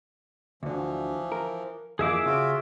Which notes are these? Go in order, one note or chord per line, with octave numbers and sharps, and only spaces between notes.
D2 D3 E3 F3
A#4
F2 E3 A#3 G#4 E5 D6
C#3 F4 F#4